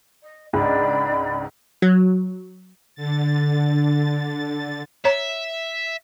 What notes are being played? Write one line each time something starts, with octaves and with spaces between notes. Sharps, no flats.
D#5
C#2 G#2 D4 D5 B5
F#3
D3 A6
C#5 E5 A#5